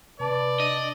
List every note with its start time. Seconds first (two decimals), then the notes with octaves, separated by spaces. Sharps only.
0.20 C3 B4 D5 A5 D7
0.60 D4 D#5